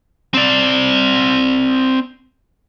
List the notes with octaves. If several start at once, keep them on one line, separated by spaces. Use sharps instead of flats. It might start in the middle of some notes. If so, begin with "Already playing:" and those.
C4 D5